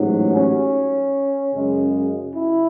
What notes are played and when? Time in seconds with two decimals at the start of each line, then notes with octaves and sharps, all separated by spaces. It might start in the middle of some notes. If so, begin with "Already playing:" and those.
Already playing: A1 G#2 F#3
0.32 C#4
1.55 F#2 C#3 G#3
2.35 E4